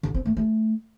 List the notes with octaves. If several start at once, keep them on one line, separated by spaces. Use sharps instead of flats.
D3
C4
A3
A3